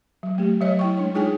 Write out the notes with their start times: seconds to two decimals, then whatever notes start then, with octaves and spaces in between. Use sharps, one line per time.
0.23 F#3
0.38 A3 G4
0.61 F#3 C#5 D#5
0.79 E4 G5 C#6
0.97 G#3 D4 C#5
1.14 D#4 F4 G#4 C#5 G5 G#5